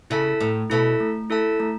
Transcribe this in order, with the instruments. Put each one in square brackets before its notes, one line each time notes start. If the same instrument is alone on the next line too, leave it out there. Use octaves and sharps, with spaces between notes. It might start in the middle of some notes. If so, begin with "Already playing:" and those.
[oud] C#3 [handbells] E4 A4 E5 A5
[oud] A2 [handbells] A3
[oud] B2 [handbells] E4 A4 E5 A5
[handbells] A3
E4 A4 E5 A5
A3